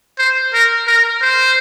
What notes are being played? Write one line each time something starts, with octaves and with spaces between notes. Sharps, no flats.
C5
A#4
A#4
C5